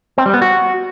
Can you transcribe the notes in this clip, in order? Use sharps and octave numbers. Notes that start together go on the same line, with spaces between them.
C4
G3
B3
F#4